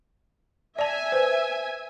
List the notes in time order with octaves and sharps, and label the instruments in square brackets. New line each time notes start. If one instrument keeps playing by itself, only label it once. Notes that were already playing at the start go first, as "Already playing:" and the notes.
[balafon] D5 A5 [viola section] E5 G#5
[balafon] B4 C5